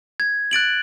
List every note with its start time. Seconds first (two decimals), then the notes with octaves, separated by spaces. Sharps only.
0.20 G#6
0.51 F#6 A6 D7 F#7